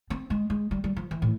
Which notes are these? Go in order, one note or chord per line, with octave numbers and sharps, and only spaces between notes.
C4
G#3
G#3
G3
G3
F3
E3
A2